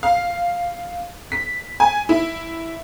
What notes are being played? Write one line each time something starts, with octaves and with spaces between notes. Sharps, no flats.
F5
B6
G#5
E4